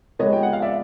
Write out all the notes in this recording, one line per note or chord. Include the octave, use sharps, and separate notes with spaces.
C3 F3 G#3 B3 C#5 D#5
G5
F#5
F5
D5 E5